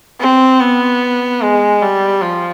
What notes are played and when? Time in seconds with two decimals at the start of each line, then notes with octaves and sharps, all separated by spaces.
0.21 C4
0.60 B3
1.41 G#3
1.82 G3
2.22 F3